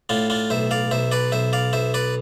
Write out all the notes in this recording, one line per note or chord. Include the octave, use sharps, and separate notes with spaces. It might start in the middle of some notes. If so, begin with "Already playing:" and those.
A2 D4 F4
D4 F4
B1 C5 E5
D5 F5
B1 C5 E5
B4 D5
B1 C5 E5
D5 F5
B1 C5 E5
B4 D5